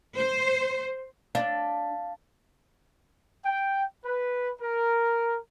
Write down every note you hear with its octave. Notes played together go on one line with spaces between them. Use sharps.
C5
D4 F5
G5
B4
A#4